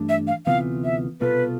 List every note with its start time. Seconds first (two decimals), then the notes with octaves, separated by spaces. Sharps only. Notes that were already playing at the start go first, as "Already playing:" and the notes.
Already playing: G2 E3 A3 D4
0.09 E5
0.27 F5
0.46 D2 C3 E3 B3 F4 F5
0.84 E5
1.21 C2 B2 B3 F4 A4 B4